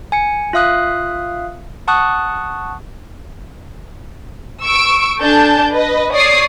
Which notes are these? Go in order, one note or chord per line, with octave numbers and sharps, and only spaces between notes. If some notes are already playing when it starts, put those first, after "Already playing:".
G#5 C#7
F4 E5 F5 D#6 F#6
F#5 A5 C#6 D#6 F#6
C#6 E6 D7
D4 A4 G#5 A5 G6
B4 D#5
C#5 D5 D#6 C7 D7